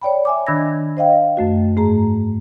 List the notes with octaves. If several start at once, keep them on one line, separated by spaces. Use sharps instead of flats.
C#5 D5 G5 B5
E5 G#5 D6
D#3 D4 B5 E6 G#6 A#6
C5 D#5 F5 G5
F#2 A3 F#4
G#2 A3 G#4 A#5